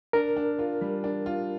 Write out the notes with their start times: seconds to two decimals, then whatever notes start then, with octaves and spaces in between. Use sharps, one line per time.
0.13 D4 A#4
0.36 D4
0.59 F4
0.81 G3
1.04 D4
1.26 F4